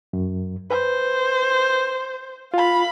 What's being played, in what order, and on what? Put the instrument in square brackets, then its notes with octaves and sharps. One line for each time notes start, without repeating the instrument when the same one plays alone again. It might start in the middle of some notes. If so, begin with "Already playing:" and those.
[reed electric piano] F#2
[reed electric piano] B4 [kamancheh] C5
[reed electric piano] F4 [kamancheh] F5 B5